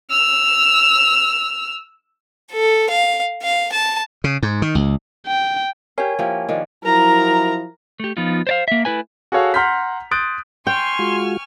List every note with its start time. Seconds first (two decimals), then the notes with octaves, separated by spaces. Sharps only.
0.11 E6 F6
2.52 A4
2.90 F5
3.43 F5
3.72 A5
4.24 C#3
4.43 G#2
4.62 D#3
4.75 C#2
5.27 G5
5.98 G4 A#4 C#5 F5 G#5
6.19 F3 A#3 E4 G4
6.49 D#3 F3 D4
6.84 F3 F#3 E4 A#4 A#5
8.00 A3 G4
8.17 F3 B3 D#4 F4
8.47 C5 D5 F5
8.68 A#3 E5
8.85 A3 E4 B4 G#5
9.32 F#4 G#4 A4 C#5 F5
9.54 F#5 A#5 C6 F6 G6 B6
10.11 C6 D#6 F#6 G6 A6 D7
10.67 G5 G#5 C6 C#6 F6
10.99 G#3 F4 F#4